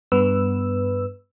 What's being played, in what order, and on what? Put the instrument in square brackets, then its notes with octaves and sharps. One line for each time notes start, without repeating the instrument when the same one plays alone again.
[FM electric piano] G2 B3 B4 E6